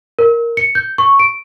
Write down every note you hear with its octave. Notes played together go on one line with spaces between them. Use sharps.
A#4
C#7
G6
C#6
D7